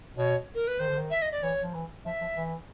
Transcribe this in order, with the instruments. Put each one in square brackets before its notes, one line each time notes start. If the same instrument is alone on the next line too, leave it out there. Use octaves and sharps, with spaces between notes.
[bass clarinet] B2 [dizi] C#5
[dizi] A#4
B4
[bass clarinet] D#3 [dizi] C5
[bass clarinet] D3
D#3
[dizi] E5
D#5
D5
[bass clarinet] E3 [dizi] C#5
[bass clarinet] F3
E3
[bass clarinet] F3 [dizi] E5
[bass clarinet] F3
E3